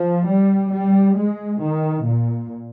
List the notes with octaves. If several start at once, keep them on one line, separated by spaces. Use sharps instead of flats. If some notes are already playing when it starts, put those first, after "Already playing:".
Already playing: F3
G3
G3
G#3
D#3
A#2